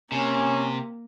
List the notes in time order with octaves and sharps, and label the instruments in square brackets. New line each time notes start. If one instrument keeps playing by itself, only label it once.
[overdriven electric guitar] C3 [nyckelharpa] A#3 [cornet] C#4 [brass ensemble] G#5